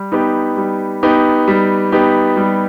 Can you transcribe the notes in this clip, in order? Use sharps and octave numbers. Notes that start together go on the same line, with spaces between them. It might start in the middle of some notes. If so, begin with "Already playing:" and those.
Already playing: G3
B3 D#4 G4
G3
B3 D#4 G4
G3
B3 D#4 G4
G3